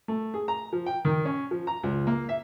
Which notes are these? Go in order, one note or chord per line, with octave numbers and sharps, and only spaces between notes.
A3
G#4
A#5
F3
G5
D#3
C#4
F3
A#5
C#2
A#3
E5